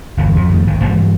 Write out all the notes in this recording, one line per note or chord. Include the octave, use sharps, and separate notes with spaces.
G1 E2
F2
F2 D#3 A3
G#1 G#2 D#3
G2 E3 F#3 G#3